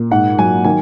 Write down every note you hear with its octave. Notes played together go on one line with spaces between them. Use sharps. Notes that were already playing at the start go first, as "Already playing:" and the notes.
Already playing: A#2
G#2 F#5
F#3 G#5
D#3 G#5